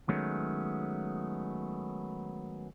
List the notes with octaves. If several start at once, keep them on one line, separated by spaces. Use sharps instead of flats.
D#3 F#3 G#3 A3 B3 C#4